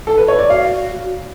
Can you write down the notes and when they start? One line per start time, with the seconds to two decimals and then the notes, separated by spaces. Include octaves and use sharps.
0.07 A4
0.18 B4
0.28 C#5
0.39 D5
0.50 F#4 F5